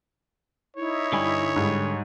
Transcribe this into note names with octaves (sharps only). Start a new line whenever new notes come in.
D#4 E4 C#5
G2 D3 G#5 B5
G#2 G3